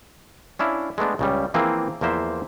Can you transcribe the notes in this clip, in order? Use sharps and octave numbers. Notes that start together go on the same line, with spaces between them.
C#4 D4 E4 F5
G#3 A3 B3 D4
C#2 C#3 G3
E3 F3 A#3 C4 E4 G#4
E2 F3 A#3 C5 E5